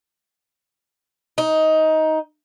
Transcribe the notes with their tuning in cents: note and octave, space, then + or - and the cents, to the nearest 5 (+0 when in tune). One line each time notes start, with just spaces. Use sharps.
D#4 +15